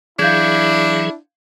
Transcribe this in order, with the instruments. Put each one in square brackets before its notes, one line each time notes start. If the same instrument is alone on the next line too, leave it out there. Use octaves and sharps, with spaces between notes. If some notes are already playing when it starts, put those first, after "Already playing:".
[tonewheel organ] E3 F#3 G#4 [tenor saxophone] D4 [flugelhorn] E4 [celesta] F5 G6 G#6